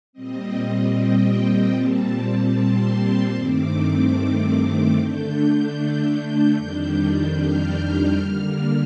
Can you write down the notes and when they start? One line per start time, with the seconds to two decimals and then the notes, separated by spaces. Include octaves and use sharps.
0.13 A#2 G3 C4 D#5
0.93 G5
1.73 A#2 G3 C4 A5
2.54 C6
3.34 G2 D#3 A3 C4 D6
4.95 D3 A3 D4 G6
6.55 F2 D#3 G3 D4 G6
7.36 F6
8.16 D3 G3 A#3